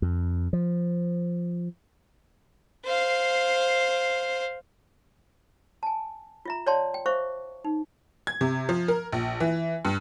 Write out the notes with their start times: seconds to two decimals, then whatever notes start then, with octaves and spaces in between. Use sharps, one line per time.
0.02 F2
0.53 F3
2.86 C5 F5
5.83 G#5 A5
6.45 F4 E5 A#5
6.66 C#5 D5 F5 G5 A5 C6
6.94 G5
7.06 C5 E5 F5 C#6 D6
7.64 D#4
8.27 G#6
8.41 C3
8.69 F3
8.88 A#4
9.13 A#1
9.40 E3
9.85 G2